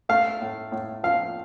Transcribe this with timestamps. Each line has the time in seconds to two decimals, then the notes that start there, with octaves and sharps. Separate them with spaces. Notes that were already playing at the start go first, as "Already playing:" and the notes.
0.09 A3 F5
0.41 A2
0.72 A2
1.04 F3 F5